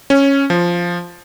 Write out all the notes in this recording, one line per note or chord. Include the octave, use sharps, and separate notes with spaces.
C#4
F3